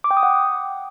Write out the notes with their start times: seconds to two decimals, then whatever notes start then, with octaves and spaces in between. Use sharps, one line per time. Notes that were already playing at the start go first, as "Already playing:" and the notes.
0.04 D6
0.11 G5
0.17 D#6
0.23 F#5